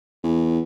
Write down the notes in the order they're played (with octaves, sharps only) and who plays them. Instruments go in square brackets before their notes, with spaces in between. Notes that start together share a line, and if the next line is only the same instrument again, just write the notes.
[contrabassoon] E2